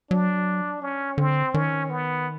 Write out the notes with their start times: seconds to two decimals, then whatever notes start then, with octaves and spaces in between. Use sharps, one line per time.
0.11 F#3 D4
0.82 C#4
1.18 D3 C4
1.54 D#3 C#4
1.90 B3